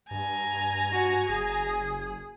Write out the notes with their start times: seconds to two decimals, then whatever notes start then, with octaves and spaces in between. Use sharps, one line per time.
0.11 G2 G#5 A#5
0.92 F#4
1.29 F#1 G#4